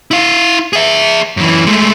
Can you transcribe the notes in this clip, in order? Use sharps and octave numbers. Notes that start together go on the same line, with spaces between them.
E4 F5
G#4 E5
F#2 E3
G#3 A3